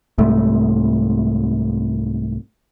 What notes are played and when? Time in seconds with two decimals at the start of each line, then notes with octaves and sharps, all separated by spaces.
0.18 C2 G#2 A3